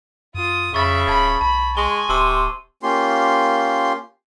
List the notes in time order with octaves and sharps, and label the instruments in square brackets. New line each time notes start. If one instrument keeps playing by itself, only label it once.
[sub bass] F#2 [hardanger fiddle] F4 D#6
[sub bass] F2 [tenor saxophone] C#3 [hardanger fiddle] E5 B5 [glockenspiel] C#6 A6
[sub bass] D1 [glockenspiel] A5 G#6 A6 [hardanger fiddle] B5
[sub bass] B1 [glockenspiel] A5 [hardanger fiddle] B5
[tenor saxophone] G#3 [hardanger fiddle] G#5 [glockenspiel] C6 C#6 G7
[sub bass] D1 [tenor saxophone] C3 [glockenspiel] A5 C6 D#7
[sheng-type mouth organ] A#3 C#4 F4 G4 C6